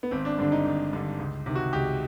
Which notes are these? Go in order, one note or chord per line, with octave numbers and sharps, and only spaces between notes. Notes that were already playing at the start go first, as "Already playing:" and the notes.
B3
G#1 C4
D4
G2 D3 D4
D#4
G#1
G2 D3
C#2
C3 D#3
F#4
C#2 G4